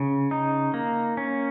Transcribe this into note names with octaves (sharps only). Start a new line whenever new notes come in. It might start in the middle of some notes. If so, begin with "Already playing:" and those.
Already playing: C#3
D#4
A#3
C#4